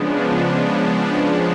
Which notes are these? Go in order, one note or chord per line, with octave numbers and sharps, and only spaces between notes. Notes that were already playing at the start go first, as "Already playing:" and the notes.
Already playing: C#3 F3 G#3 B3 D4